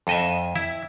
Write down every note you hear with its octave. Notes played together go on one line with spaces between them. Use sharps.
F2 D#5 E5
E4